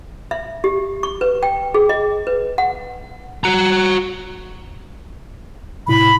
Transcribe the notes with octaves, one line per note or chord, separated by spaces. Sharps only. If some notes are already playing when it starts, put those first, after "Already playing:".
E5
G4
C#6
B4
G5
G#4
D#5
B4
F#5
F#4 A#5
A2 C3 E4 B5